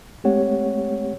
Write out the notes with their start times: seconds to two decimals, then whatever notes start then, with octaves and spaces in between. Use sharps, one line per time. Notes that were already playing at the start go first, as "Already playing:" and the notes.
0.24 G#3 A3 C4 G4 C#5 F#5